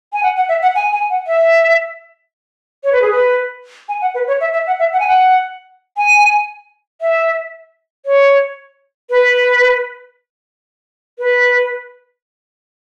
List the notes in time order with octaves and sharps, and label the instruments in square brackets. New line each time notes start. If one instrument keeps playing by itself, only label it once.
[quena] G#5
F#5
F#5
E5
F#5
G#5
G#5
F#5
E5
C#5
B4
G#4
B4
G#5
F#5
B4
C#5
E5
E5
F#5
E5
F#5
G#5
F#5
G#5
E5
C#5
B4
B4